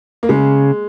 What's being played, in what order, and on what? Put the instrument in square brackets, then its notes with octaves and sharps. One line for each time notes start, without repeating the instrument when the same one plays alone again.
[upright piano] A#3
[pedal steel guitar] C#3 [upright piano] G#3